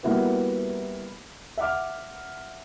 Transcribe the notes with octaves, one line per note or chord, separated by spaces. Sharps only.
G3 A#3 B3 E4 F#4 B4
E5 F#5 D6 F6